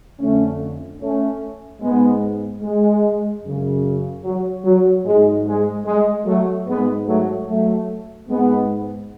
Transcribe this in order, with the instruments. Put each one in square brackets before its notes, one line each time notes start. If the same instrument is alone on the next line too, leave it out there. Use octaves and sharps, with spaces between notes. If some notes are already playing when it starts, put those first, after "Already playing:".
[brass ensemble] F2 D3 A3 C#4
A3 C#4
G#2 G#3 B3
G#3
F#2 C#3
F#3
F#3
G#2 G#3
G#3
G#3
F#3 A3
G#2 G#3 B3
F#3 A3
F#3 A3
G#2 G#3 B3